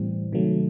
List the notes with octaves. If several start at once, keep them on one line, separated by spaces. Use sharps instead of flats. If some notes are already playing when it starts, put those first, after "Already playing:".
Already playing: A2 E3 G3 C4
C3 D#3 F#3 A3